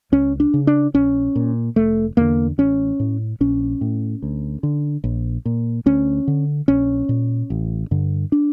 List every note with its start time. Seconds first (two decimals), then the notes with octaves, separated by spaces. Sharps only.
0.12 C#2 C#4
0.40 D4
0.54 C#3
0.67 D4
0.94 A#1 C#4
1.36 A#2
1.76 F1 A3
2.17 E2 D3 A#3
2.58 A1 C#4
3.00 A2
3.40 A#1 C#4
3.81 A2
4.22 D2
4.63 D3
5.04 A#1
5.45 A#2
5.86 D2 C#4
6.28 D3
6.68 A#1 C#4
7.09 A#2
7.50 A1
7.91 G2 D3
8.32 D4